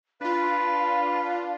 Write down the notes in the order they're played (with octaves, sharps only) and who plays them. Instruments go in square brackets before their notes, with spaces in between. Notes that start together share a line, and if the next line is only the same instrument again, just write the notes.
[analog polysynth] D4 F4 [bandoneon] B4 [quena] F5